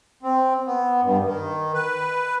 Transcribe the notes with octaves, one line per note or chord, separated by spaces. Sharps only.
C4
B3
G2
D#3
B4